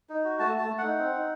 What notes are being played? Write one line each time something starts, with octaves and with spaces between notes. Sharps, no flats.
D#4
F#4
A3 A5
A3 A5
A3
D#4 F#5
C4
D#4